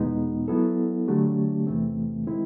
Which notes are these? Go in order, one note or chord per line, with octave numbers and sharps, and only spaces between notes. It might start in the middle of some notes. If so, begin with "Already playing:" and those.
Already playing: E2 B2 G#3 B3 D#4
F#3 B3 E4 A4
D3 F#3 A3 D4 G4
E2 C3 E3 A3 C4
D#3 G#3 C4 E4